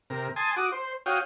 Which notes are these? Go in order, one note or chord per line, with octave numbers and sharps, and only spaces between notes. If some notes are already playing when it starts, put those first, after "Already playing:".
C3 A#4
G#5 A5 C6 D#6
F#4 D6 D#6
C5
F#4 C#5 F5 G5 D#6